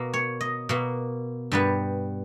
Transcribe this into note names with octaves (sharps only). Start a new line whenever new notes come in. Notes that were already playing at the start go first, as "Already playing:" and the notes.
Already playing: B2 A#3
C#5
D#5
B2 A#3
G2 G3 B3 B4